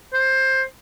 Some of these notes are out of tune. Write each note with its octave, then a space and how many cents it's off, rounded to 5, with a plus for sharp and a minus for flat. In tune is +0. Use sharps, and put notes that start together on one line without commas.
C5 +15